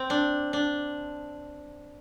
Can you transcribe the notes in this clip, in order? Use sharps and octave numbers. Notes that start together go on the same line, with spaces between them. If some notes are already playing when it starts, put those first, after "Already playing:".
Already playing: C4
D4
D4